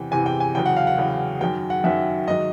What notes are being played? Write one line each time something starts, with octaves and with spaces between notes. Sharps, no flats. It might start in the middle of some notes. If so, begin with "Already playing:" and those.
Already playing: E2 C3 E3 G5
E2 C3 E3 G#5
G5
G#5
E2 C#3 F#3 G5
F#5
F5
F#5
E2 C#3 F#3
F#2 D#3 F#3 G5
F#5
F#2 D#3 F#3 E5
G#2 D#3 F#3 D#5